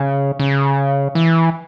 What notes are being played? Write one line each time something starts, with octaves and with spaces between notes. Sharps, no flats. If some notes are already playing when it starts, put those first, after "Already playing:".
Already playing: C#3
C#3
E3